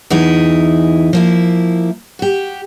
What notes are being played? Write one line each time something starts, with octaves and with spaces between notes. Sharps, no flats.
E2 E3 D#4 E4
F3 A#3 E4
F#4 G4